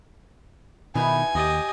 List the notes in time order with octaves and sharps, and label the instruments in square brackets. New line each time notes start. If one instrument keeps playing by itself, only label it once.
[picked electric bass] B2 D#3 [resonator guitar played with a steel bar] B3 D#4 E4 [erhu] G#5
[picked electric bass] D#2 [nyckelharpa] G4 D#5